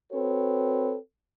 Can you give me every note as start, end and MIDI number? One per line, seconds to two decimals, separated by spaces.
0.13 0.96 60
0.13 0.96 66
0.13 0.96 69
0.13 0.96 71
0.13 0.96 73